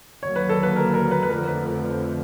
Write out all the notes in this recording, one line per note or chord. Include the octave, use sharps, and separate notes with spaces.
D#2 D3 F#3 A#3 C#5
B4
A4
B4
A#4
A#4
B4
B4
F2 D3 F3 A3 A#4
B4
B4